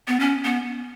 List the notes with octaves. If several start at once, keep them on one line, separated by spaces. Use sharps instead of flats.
B3
C#4
B3